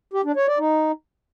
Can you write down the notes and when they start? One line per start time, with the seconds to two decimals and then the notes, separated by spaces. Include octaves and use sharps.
0.14 G4
0.25 D4
0.36 C#5
0.47 D5
0.59 D#4